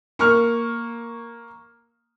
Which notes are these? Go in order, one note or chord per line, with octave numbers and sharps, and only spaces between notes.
A#3 C#6 F6